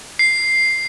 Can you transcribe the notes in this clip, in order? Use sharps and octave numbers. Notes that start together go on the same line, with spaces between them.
C7